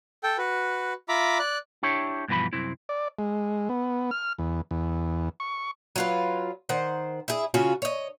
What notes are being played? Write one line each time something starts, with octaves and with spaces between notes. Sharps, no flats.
A4 G5
F#4 B4
F4 E5 A#5 B5 D6
D5 F#6
D4 E4 G4 C#5
G2 B2 E3 F3 B5
C2 F#2 C4 E4
D5
G#3
B3
F6
E2
E2
C#6
F#3 F4 B4
D#3 C5 F#5
E4 G#4
C#3 C#4 F4 F#4
C#5 D#5